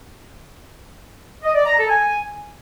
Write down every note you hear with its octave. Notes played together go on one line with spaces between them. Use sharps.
D#5
D5
A#5
A4
G#5